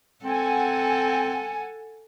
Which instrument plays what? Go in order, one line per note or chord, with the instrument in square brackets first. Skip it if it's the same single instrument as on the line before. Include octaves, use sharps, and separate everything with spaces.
[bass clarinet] C4 [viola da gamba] A4 [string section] F#5 G#5